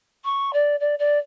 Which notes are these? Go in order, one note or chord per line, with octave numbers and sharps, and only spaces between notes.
C#6
D5
D5
D5